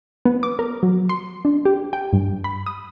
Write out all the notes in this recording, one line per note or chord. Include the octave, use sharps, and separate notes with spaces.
B3
D6
A#4
F#3
C6
D4
G4
G5
G2
B5
D#6